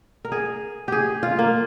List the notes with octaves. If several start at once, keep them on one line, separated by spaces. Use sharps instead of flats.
A#4
G#4
G4 G#4
F4
A#3